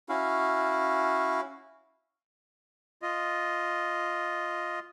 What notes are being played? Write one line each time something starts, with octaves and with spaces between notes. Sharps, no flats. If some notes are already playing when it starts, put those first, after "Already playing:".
C#4 E4 F#4 F5
F4 D#5